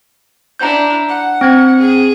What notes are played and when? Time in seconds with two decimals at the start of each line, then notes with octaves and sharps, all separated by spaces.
0.59 D4 E4 A#5 G6
1.08 F#5
1.41 C4 G#6
1.79 G#4